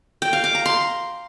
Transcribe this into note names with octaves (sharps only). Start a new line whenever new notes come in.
G5
F5
D6
A#5
C6